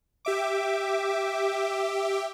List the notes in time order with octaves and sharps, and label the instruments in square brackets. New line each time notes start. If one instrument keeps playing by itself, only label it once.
[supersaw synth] G4 E5 D6